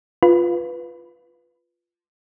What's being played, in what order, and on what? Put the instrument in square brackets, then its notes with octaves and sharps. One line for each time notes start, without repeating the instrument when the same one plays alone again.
[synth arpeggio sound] F4 B4